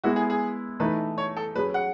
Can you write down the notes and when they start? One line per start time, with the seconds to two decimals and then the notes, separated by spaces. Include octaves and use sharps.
0.04 G#3 B3 E4 F#4
0.16 G#4
0.30 G#4
0.80 E3 A3 D#4 B4
1.18 C#5
1.37 A4
1.55 F#3 C#4 G#4 B4
1.74 F#5